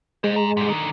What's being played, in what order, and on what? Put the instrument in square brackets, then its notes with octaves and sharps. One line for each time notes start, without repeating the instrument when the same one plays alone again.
[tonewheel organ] G#3 [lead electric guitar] C5 D#5
[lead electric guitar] G#5 A#5
G#2 G3
D3 D#3